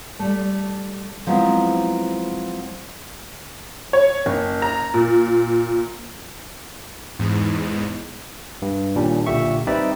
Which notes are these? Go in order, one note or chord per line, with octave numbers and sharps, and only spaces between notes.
G3 A3
F3 F#3 G#3 B3 C4 E4
C#5
F#1
A#5
A#2
E2 G#2
G2
A#2 D#3 G3 C#4 D4
B1 A#2 D3 G4 E5 C#6
G3 C4 D#4 B4 D5 E5